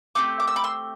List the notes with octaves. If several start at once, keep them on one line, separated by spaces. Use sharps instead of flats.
A3 C4 G4 D6
D6
E6
B5 D6
C6 E6